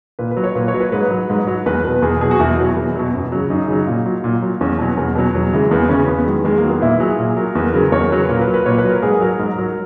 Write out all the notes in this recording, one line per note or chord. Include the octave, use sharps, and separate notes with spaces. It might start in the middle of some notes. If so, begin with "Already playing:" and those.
A#2 B4
B4
F#3
C#5
A#2 B4
C#5
F#3
B4
G#2 B4
F#3
G#2
F#3
E2 B4
B2 F#3 B4
E2 G#4
B2 F#3 G#4
F#4
E2 E4
B2 F#3
E2
B2 F#3
F#2
C#3 F#3
F#2 D#4
C#3 F#3
A#2
F#3
A#2
F#3
E2 C#4
B2 F#3
E2
B2 F#3
E2 F#3
C#3 E3 G#3
E2 B3
C#3 E3 C#4
E2 B3
D#3 F#3 G#3
E2 G#3
A#3
D#3 F#3
B3
A#2 E4
F#3 G#4
A#2 G#4
F#3 A#4
E2 B4
C#3 F#3 A#4
E2 C#5
C#3 F#3 B4
A#2 A#4
B4
F#3
B4
A#2 C#5
B4
F#3
A#4
G#2 G#4
F#3 A#4
G#2 A#4
F#3